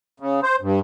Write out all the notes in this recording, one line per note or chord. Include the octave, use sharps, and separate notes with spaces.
C#3
C5
G2